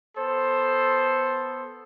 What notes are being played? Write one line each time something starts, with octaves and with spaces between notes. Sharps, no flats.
B3 A4 C5